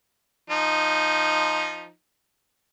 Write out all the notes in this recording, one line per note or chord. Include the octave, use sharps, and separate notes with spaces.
F3 D#4